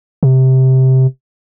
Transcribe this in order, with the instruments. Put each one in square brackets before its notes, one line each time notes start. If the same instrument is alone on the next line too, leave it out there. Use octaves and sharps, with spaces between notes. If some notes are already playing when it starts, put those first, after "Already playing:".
[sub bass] C3